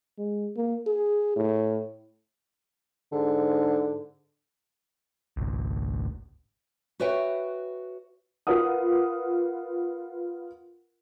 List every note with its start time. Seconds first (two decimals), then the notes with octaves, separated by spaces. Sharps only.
0.18 G#3
0.57 A#3
0.86 G#4
1.36 A2
3.12 G#2 D3
5.37 G#1 C#2
7.00 F#4 B4 C#5 E5 G5
8.47 F4 A#4 B4 F#5 D#6